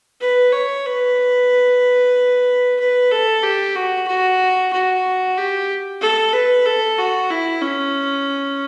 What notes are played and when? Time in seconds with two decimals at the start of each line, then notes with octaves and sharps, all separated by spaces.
0.21 B4
0.53 C#5
0.85 B4
2.80 B4
3.12 A4
3.43 G4
3.76 F#4
4.07 F#4
4.73 F#4
5.37 G4
6.01 A4
6.33 B4
6.66 A4
6.98 F#4
7.30 E4
7.62 C#4